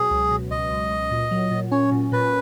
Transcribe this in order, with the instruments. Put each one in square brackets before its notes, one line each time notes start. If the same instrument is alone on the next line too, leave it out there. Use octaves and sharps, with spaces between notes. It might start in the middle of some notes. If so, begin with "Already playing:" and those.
Already playing: [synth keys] B2 F#3 [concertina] G#4
[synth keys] C#2
B2
[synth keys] C#2 [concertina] D#5
[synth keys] C#2
C#2
A#2
F#3
A#2
[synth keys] C#4 [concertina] C#5
[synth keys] A#2
[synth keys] A#2 [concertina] B4